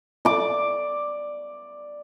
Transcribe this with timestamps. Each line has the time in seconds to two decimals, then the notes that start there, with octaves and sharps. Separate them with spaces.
0.25 D5 D6